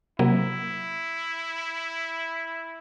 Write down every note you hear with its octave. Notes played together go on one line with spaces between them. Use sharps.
C3 F#3 A#3 E4